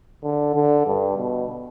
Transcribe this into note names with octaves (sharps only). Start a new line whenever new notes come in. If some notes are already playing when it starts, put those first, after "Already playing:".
D3
D3
G2
B2